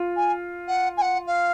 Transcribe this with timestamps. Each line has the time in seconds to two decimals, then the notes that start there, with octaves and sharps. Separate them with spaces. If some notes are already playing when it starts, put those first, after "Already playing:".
Already playing: F4
0.16 G#5
0.68 F#5
0.97 G#5
1.02 F#5
1.27 F5